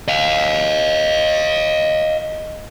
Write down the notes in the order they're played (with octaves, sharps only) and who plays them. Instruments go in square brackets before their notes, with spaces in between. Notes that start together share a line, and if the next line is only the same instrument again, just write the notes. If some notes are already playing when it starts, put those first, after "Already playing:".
[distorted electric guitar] D#5 F5